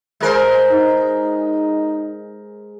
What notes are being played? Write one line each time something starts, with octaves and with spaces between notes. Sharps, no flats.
G#3 A#4 C5
D#4